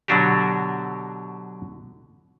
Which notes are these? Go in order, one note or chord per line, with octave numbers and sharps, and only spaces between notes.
B2 D3 F#3 D4 F#4 G4